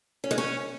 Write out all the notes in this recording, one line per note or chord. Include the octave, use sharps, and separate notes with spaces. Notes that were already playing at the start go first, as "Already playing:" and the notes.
C#4
G#3
C#4